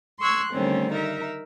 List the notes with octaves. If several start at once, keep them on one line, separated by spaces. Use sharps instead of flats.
C6 C#6 E6 F#6 G#6
D3 D#3 G3 A3 C4 C#4
D#4 A#4 E5